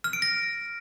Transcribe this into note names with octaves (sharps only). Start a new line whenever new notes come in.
F6
D7
A#6